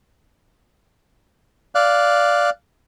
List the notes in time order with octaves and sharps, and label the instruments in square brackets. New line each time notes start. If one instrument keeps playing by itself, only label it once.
[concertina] D5 F5 F#6